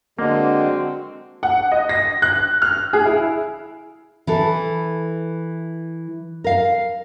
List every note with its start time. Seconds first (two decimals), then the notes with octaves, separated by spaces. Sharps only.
0.19 D3 G#3 A#3 C4 F#4
1.43 F#5
1.72 D#5
1.89 A#6
2.22 F#6
2.62 F6
2.93 G#4
3.06 E4
4.27 E3 E4 A4
6.44 A#4 F5